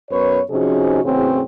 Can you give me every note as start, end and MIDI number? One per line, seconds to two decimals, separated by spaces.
0.10 0.40 42
0.10 0.40 59
0.10 0.40 71
0.10 0.40 73
0.50 1.03 48
0.50 1.03 53
0.50 1.03 61
0.50 1.03 63
0.50 1.03 66
0.50 1.03 68
1.04 1.41 40
1.04 1.41 45
1.04 1.41 49
1.04 1.41 60
1.04 1.41 61
1.04 1.41 66